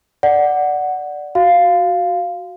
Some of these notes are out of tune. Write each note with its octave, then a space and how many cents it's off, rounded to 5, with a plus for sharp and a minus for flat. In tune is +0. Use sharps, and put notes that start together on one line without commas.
D5 +0 F#5 +0
F#4 +0 F5 +0